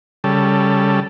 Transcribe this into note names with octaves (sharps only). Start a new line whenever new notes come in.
C#3 G3 A4